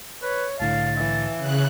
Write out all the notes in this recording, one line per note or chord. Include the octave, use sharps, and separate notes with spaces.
B4 C#5
C2 A2 D3 F5 A5
E3
C#3 F#6